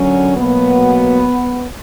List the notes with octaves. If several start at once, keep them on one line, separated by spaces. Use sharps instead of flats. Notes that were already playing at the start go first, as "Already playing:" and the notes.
Already playing: F#2 D3 F#3 C#4
B2 F#3 A#3 B3